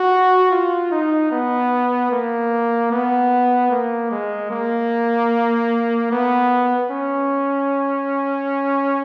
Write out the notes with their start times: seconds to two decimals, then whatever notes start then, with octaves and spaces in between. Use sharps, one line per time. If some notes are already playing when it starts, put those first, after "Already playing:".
Already playing: F#4
0.51 F4
0.91 D#4
1.32 B3
2.11 A#3
2.91 B3
3.71 A#3
4.11 G#3
4.51 A#3
6.11 B3
6.91 C#4